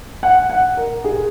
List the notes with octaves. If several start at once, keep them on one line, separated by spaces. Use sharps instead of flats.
F#5
F#5
A#4
G#4